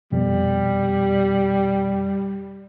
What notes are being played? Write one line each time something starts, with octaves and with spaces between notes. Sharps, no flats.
F2 B2 G3